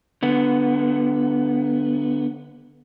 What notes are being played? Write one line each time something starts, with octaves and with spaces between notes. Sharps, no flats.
D3 B3